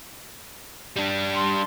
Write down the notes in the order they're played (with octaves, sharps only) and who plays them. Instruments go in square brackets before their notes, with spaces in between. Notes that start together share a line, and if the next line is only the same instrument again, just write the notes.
[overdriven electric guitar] G3 D4
[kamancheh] A5 C6